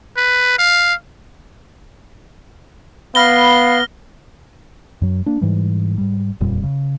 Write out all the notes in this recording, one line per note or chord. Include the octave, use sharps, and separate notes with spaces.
B4
F5
B3 F5 B5 F6 A#6 G7
F#2 F#3
A#3 D4
G#2 E3 G3
G#2 G3
D#1 F2 A#2 G3
C#3